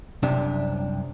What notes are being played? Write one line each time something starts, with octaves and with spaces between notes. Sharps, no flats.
C2 F#2 C3 D4